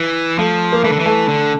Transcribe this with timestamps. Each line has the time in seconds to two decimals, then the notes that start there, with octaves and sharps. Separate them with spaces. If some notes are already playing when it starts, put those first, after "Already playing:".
Already playing: E3
0.38 F3 A3
0.72 A#3
0.84 E3 A3
0.92 D3
0.99 E3
1.06 A3
1.28 D3